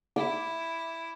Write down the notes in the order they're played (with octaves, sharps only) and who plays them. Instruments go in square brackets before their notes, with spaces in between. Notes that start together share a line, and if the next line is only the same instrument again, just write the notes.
[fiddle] E4 [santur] D6